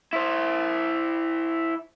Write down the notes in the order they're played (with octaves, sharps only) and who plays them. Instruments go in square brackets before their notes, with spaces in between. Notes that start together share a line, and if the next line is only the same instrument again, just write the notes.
[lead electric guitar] E4 C5